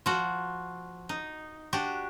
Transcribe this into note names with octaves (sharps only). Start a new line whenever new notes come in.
F3 F#4
D#4
D4 F#4 G4